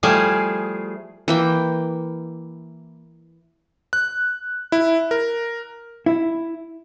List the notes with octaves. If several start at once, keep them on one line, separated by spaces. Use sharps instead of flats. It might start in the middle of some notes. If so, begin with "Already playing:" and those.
F3 G3 A3 E4 G#4 F5
E3 A#3 G5
F#6
E4
A#4
E4